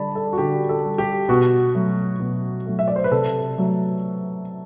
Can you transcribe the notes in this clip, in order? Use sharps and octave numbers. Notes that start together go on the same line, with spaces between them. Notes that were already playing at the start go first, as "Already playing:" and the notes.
Already playing: D3 G3 D5 A5 B5
A4
F#4
D3 G4
A4
G3
G4
B2 F#4
F#3 A3
B2
F#3 A3
E5
D5
C5
B4
C3 A4
F#3 A3